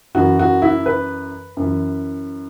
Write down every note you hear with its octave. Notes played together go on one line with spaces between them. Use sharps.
F#2 E3 F#4
F#4
E4
B4
F#2 E3